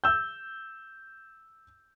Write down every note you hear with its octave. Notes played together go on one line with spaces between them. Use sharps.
E6 G6